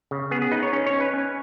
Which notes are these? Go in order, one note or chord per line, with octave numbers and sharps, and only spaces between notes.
C#3
B3 G#4
G#4
D#4 B4
C#5
C#4
C#5
C#4
B4
C#4